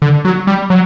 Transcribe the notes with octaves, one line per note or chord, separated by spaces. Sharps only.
D3
F#3
G3
F#3